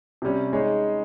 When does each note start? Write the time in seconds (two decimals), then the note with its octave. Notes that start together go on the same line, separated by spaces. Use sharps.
0.22 C3 G3 C#4
0.53 G#3 D#4 G#4 C#5